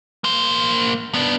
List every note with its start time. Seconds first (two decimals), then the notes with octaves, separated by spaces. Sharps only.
0.24 A#3 C5
1.14 B3 D4